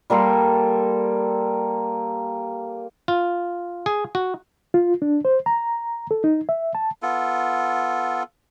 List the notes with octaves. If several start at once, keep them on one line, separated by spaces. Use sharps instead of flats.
G3 A#3 A4 C6
F4
G#4
F#4
F4
D4
C5
A#5
A4
D#4
E5
A5
B3 F4 A4